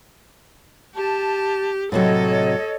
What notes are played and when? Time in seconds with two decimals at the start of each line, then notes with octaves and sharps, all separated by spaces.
0.95 G4 A5
1.92 A2 C3 F#3 A4 C#5 D#5